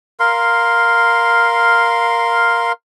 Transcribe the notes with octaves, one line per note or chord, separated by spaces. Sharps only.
A#4 F5 C6